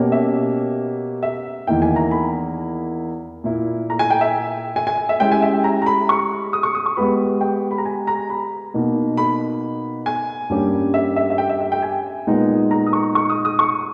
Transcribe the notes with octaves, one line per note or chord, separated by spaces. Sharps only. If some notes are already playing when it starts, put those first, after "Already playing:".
Already playing: B2 A#3 C#4 G4 C#5
E5
E5
E2 D#3 A#3 E4 G5
G#5
A#5
B5
A#2 A#3 E4
A#5
G#5
G5
E5
G#5
G#5
E5
G#3 C#4 E4 G4 G5
G#5
E5
G5
A#5
A#5
B5
C#6
D#6
C#6
D#6
C#6
G#3 B3 G4 B4 B5
G5
B5
A#5
G#5
A#5
B5
B2 A#3 D#4
B5
G#5
G2 G3 A#3 C#4 G4
E5
E5
E5
G5
E5
E5
G5
G#5
A#2 G#3 B3 D#4
A#5
D#6
C#6
C#6
D#6
D#6
C#6